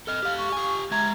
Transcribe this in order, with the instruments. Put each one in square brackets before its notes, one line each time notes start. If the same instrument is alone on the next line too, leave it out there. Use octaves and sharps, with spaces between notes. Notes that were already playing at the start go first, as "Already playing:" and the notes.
[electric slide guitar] A4 D#5 [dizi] F6
[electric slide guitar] G4 F5
[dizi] C#6
[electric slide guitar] G4 G#5
[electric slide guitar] G#3 E5 A#5 [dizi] G#6